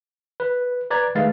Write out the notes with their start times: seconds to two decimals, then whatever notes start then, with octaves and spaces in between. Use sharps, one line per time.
0.40 B4
0.91 B4 D5 A#5 G#6
1.15 D#3 G#3 A3 B4 F5 A6